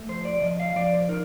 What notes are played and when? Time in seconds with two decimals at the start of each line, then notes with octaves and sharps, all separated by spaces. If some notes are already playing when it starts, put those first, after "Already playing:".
Already playing: A3
0.09 F3 C5
0.25 D5
0.42 F3 D#5
0.60 F5
0.76 F3 D5
0.93 C5
1.09 D#4 A#4